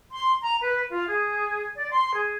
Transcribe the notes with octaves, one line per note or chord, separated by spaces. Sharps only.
C6
A#5
B4
F4
G#4
D5
C6
G#4